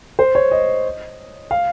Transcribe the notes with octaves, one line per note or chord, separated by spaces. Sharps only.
C5
C#5
D#5
F5